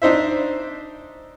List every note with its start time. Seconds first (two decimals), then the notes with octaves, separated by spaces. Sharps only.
0.02 D4 D#4 C5 E5